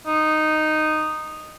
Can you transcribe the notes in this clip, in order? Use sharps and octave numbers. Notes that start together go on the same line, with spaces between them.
D#4